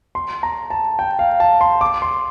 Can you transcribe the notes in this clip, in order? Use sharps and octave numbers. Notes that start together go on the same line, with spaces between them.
C6
A#5
A5
G5
F5
A5
C6
D6
C6